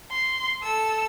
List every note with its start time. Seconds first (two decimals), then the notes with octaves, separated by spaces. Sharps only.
0.11 C6
0.62 A4 E6